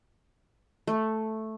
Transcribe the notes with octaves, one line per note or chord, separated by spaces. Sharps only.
A3